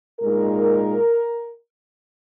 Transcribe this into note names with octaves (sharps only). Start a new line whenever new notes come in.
A#2 G#3 D#4 A#4